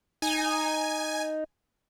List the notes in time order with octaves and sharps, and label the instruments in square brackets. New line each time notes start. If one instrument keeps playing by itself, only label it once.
[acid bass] D#4 [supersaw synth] G#5